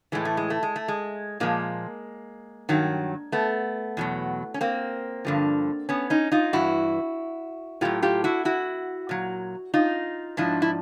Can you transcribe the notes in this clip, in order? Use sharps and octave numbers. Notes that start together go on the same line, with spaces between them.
A2 E3 G#3
A3
G#3
A3
G#3
A3
G#3
A#2 F3 G#3 A#3
G2 D#3 F#3
A3 B3
E2 B2 F#3
C#4
A#3 C4
G2 D3 F3
B3 C#4
C#4 D#4
D#4 F4
G2 E3 E4 F#4
A2 F#3 F4 G4
F4 G4
E4 F#4
E4 F#4
A#2 F#3
D#4 F4
G#2 F3 D4 E4
E4